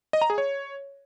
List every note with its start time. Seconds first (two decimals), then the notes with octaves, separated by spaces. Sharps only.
0.13 D#5
0.22 A#5
0.30 G#4
0.38 C#5